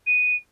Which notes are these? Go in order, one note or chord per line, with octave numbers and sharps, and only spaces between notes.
D#7